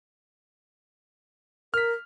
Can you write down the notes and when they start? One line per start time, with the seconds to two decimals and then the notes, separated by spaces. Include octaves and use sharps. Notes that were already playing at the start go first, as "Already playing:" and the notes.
1.74 A#4 F6 B6